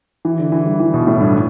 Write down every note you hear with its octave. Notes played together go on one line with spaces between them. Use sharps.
E3
D3
E3
G3
E3
B2
A2
G2